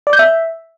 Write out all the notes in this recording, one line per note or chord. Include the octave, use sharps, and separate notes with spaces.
D5
G6
E5